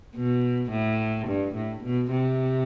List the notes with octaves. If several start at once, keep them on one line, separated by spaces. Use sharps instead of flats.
B2
A2
G2
A2
B2
C3